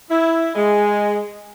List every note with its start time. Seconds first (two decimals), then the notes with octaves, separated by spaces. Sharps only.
0.10 E4
0.55 G#3